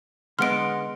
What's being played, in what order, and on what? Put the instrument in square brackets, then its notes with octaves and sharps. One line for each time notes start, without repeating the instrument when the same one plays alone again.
[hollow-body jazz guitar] D3 G#3 B3 [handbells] D#5 F#5 C6 [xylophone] F6 D7